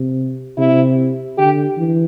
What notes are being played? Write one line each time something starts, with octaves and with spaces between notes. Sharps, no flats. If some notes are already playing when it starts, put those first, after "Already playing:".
Already playing: C3
C3 E4
D3 G4
E3